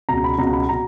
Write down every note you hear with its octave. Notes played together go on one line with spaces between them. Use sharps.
C#2 B2 A#5
B5
C#2 B2 A#5
B5
B2 A#5